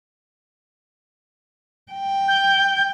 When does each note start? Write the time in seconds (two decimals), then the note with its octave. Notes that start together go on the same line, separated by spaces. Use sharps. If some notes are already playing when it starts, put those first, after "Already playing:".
1.92 G5
2.27 G6